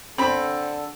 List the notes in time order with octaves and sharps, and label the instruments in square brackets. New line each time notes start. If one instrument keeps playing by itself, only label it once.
[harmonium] D3 A4 [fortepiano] C4 B5